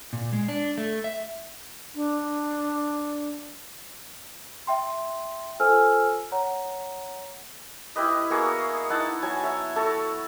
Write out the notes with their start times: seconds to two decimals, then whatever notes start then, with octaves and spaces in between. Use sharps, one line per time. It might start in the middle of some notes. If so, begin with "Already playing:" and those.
0.13 A#2
0.33 G#3
0.48 D4
0.78 A3
1.04 E5
1.95 D4
4.67 E5 G5 C6
5.60 F4 A4 C5 G#5 E6 F6
6.32 C#5 F#5 A#5
7.96 E4 G4 B4 D#5
8.30 A#3 B3 F#4 G#4
8.89 D#4 E4 F#5 A5
9.22 F#3 G#5 A5
9.43 C#5 E5 F#5
9.76 A3 F#4 A4 A5